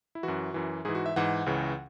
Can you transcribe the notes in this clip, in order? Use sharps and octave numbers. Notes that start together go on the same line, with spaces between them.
E4
F#2 E3 F#4
F#2 E3
G#2 E3 G#4
F#4
E5
G#2 E3 F#5
C#2 C#3 E3